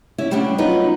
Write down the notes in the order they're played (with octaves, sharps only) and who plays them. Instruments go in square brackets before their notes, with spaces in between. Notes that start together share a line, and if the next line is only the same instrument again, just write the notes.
[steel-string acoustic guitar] C#4 E4 E5
C#3 G3 A3 B3 C#4 D4
F#3 B3 C#4 D#4 F4 B4